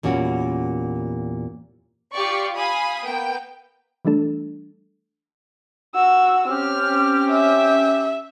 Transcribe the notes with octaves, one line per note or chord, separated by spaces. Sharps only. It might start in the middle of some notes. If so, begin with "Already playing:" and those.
E2 A#2 G3 C#4 F#4
F4 G4 D5 C#6
F5 G#5 B5 D#6
A#3 B3 G5
E3 G3 A3 D4 A4
F#4 E6
C4 C#4 G4 F6
E5